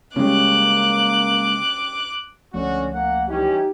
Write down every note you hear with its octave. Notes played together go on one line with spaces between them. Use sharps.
C#3 G3 G#3 A#3 C#4 D6 F#6
C#2 D3 F3 A3 C#4 F#4
A#3 F#5
E3 G3 C#4 D#4 G4